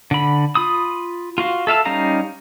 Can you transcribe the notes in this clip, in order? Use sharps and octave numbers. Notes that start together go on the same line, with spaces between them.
D3 B5
F4 B5 D#6
F4 F#4 F5
A4 E5 F5 A5
G3 C#4 D#4 F5 A#5